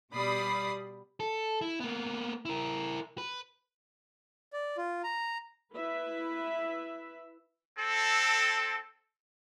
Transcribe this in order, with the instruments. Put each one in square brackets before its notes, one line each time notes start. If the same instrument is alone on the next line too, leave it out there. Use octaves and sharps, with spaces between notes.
[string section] B2 G3 D5 B5 D#6 C7
[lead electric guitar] A4
E4
A#3 B3
E4 A#4
B4
[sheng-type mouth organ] D5
F4
A#5
[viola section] E4 B4 E5
[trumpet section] C4 A4